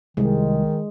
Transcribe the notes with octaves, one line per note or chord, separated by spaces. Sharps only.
C2 D#3 G#3